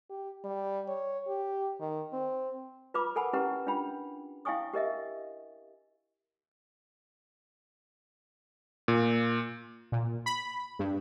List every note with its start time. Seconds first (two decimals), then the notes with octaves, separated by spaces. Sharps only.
0.10 G4
0.45 G3
0.88 C#5
1.28 G4
1.81 D#3
2.13 C4
2.94 F4 B4 A#5 B5 D6
3.16 A4 A#4 F#5 G#5 A5 B5
3.33 C#4 E4 G4 B4 F#5 A#5
3.67 D4 F4 G5 B5
4.45 E4 F5 G5 G#5 C#6 D#6
4.73 G4 A#4 D#5 E5
8.88 A#2
9.92 A#2
10.26 B5
10.79 G2